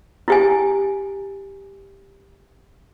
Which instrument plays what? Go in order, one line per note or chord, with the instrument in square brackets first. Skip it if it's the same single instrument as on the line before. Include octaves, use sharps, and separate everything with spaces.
[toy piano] E4 G4 G#5